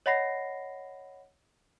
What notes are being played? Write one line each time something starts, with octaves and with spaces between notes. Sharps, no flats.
C#5 D#5 F#5 B5 A#6 C7